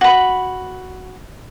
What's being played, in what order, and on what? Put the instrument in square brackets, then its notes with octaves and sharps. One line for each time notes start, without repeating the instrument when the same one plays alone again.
[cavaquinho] F#4 B5